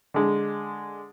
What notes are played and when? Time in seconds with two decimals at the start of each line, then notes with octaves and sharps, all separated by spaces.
0.14 D3 G#3